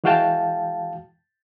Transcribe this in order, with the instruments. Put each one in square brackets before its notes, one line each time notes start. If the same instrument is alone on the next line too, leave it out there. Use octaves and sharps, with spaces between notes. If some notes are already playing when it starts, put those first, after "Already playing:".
[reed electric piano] E3 G#3 F#4 F5 G5 A5